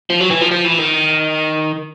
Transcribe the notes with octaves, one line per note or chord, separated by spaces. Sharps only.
F3
F#3
E3
F3
F3
E3
D#3